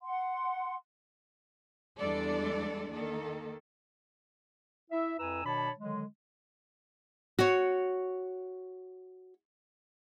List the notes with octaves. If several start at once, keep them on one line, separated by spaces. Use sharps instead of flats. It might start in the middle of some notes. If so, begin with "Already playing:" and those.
F#5 C6
E2 G3 G#3 D4 A4 D5
D#3 A#3 A4
E4 E5
F2 E4 B4 G#5 A#5 E6
B2 D#3 D4 C#5 A5 B5
D3 D#3 F#3 G#3
F#4 C#5